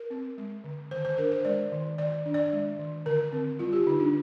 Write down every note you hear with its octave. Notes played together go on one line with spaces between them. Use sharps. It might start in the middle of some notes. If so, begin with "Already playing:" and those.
Already playing: A#4
C4
G#3
D3
D#3 C5
C5
D4 A#4
C5
G#3 D5
D#3
D#3 D5
D4
D5
G#3
D#3
D3 A#4
C4
G3 F4
G4
D3 D#4
D4